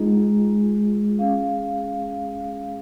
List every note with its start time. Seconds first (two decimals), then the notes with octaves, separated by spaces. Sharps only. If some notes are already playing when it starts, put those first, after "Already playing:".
Already playing: G#3 D#4 F4 G#4
1.19 C#4 G#4 F5